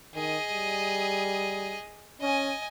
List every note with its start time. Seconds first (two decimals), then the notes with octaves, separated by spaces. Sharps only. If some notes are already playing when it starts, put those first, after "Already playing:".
0.14 D#3 G#4 D#5
0.49 G3
2.21 C#4 D#5 G#5